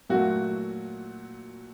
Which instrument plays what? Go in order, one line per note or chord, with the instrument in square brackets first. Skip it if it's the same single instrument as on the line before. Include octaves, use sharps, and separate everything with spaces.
[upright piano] A#2 F#3 A3 F#4